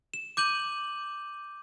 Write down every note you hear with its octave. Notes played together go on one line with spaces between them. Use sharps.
E7
D6 G6 D#7 F#7